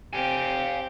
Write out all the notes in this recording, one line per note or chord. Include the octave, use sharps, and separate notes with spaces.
C4 G4 F5 G#5